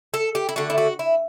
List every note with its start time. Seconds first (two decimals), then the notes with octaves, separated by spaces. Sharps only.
0.14 A4
0.35 G4
0.49 E4
0.56 D3 A3 F#4
0.70 E4
0.78 F#4
0.99 E4